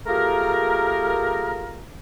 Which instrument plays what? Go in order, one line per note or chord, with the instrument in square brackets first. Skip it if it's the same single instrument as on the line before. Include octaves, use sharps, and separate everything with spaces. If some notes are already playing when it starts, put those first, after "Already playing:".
[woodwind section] A3 F4 G4 G#4 A#4